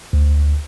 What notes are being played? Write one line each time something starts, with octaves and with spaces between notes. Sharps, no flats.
D2